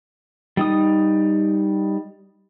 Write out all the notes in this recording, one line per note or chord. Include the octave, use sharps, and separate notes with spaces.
G3 D#4 D#6